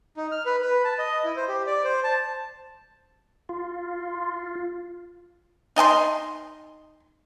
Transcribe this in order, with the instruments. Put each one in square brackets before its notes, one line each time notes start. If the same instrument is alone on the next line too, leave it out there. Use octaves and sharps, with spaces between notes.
[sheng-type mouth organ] D#4
F6
B4
B4
A5
D#5
E4
C5
G4
D5
C5
A5
[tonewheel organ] F4
[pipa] D#4 D#5 G#5 C6